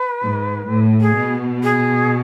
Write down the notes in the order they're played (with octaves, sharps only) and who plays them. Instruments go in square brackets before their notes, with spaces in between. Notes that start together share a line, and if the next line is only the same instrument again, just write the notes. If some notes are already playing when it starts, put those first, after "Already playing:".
Already playing: [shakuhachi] B4
[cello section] G#2
A2
[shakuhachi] G#4
[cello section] B2
[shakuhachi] G#4